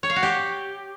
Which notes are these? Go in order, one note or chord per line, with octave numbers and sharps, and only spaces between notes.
C#5
F5
F#4
G4